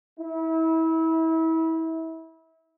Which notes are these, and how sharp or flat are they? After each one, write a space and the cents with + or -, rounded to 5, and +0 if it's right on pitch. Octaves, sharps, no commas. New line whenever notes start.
E4 -30